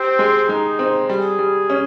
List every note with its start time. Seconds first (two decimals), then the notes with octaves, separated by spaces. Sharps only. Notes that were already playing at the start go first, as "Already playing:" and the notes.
Already playing: C4 G4
0.19 G#3
0.49 G#3 D#4
0.79 C4
1.09 G3 G#4
1.39 G3
1.70 C#4